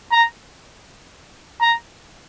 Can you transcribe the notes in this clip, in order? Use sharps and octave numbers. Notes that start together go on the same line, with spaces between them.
A#5
A#5